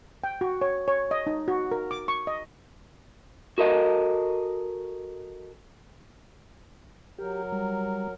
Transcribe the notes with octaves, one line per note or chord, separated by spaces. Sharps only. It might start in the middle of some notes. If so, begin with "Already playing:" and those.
G5
F#4
C#5
C#5
D#5
D#4
F#4
A#4
D6
C#6
D#5
F#4 A4 A#4 D#5
F#3 G4 A#4
G3